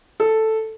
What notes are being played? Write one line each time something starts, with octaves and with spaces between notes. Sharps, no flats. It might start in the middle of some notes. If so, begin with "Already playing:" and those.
A4